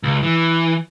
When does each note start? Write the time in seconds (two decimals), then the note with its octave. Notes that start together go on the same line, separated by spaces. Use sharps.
0.03 C#2
0.23 E3